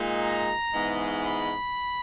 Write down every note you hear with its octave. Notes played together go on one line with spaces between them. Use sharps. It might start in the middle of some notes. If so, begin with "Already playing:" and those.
Already playing: A#2 G#3 D#4
A#5
G#2 E3 G#3 B3
B5